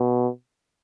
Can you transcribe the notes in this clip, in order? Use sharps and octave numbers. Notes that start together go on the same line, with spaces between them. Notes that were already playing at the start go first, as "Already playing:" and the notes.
Already playing: B2